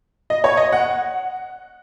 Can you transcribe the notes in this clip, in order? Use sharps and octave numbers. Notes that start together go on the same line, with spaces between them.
D#5
C#5
D#5
F#5